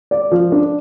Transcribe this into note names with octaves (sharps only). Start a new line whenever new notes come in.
D5
F3
D4